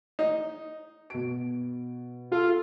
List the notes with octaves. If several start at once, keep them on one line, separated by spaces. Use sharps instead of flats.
D#4
B2 D7
F4 A4